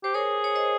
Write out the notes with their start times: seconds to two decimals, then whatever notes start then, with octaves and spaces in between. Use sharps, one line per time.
0.04 G4 C5
0.14 G#4 A#4 C#5
0.44 C#5
0.55 C5 D#5